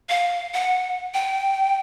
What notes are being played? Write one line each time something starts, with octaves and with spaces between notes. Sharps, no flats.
F5
F#5
G5